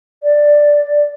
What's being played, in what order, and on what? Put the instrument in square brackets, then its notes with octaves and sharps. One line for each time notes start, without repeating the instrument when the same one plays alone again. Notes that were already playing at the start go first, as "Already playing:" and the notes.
[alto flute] D5